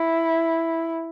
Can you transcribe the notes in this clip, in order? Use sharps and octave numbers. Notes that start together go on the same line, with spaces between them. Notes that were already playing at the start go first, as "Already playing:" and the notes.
Already playing: E4